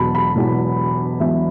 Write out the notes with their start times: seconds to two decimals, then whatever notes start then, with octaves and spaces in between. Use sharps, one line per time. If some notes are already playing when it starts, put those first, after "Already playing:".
Already playing: E1 E2 B2 F#3 A5 B5
0.15 B5
0.36 E1 E2 B2 F#3
1.20 E1 E2 B2 F#3 E5